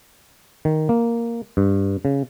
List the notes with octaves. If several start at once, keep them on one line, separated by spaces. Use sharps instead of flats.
D#3
A#3
G2
C#3